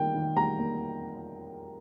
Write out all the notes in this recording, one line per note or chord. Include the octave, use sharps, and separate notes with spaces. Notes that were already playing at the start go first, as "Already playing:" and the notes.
Already playing: D#3 G3 A#3 G5
D#3
G3 A#5
A#3